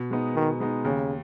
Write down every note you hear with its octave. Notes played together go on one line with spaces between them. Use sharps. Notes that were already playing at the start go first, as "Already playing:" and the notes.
Already playing: B2
G#3 B3 D#4
B2 D#3
G#3 B3 D#4
D#2 C#3